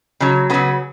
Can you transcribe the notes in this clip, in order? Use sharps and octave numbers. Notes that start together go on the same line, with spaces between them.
C#3 F#3
C#3 F#3 B3